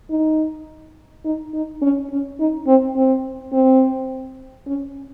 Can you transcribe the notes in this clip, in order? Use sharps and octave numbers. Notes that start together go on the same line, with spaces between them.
D#4
D#4
D#4
C#4
C#4
D#4
C4
C4
C4
C#4